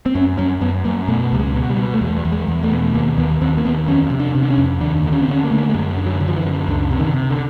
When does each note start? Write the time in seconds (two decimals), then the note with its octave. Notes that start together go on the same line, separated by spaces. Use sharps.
0.06 C4
0.15 F#2 C#4
0.38 F#2 C#4
0.61 F#2 B3
0.84 F#2 A#3
1.08 B2 A3
1.32 C#2 G3
1.39 G#3
1.55 B2
1.70 G3
1.78 B2
1.94 A3
2.02 E2 G#3
2.25 E2
2.32 G#3
2.47 E2
2.63 A3
2.72 B2
2.94 D#2 A#3
3.18 D#2 B3
3.41 D#2 C4
3.57 A#3
3.65 D#2 B3
3.88 F2 C#4
4.11 C3
4.19 D4
4.35 C3
4.43 D4
4.50 C#4
4.58 F2
4.81 D#2 D4
5.04 D3
5.12 C#4
5.22 C4
5.28 D3 C#4
5.44 A#3
5.50 D3 A3
5.57 A#3
5.69 A3
5.74 F#2 G#3
5.98 D3
6.06 F#3
6.20 D3
6.28 F3
6.37 E3
6.44 F#2
6.68 C#2 D3
6.91 C3
6.99 D#3
7.14 C3
7.30 D3